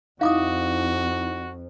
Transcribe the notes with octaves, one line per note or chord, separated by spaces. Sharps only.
F2 D#4 E4 F#4 F5 D6 D#6